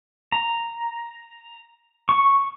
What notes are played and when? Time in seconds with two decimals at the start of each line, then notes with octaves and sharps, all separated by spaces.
0.32 A#5
2.09 C#6